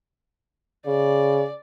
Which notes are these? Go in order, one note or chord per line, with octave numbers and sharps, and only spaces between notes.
C#3 D5